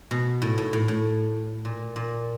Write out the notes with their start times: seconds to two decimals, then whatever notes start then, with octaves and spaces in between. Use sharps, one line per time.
0.11 B2
0.42 A2
0.58 A2
0.73 A2
0.88 A2
1.65 A#2
1.96 A#2